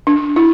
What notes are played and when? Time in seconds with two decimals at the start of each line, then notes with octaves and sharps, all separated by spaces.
0.07 D4
0.36 E4